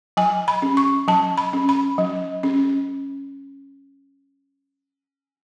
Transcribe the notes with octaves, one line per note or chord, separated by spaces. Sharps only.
F#3 G#5
B5
C#4
C#6
F#3 A5
B5
C#4
B5
F#3
C#4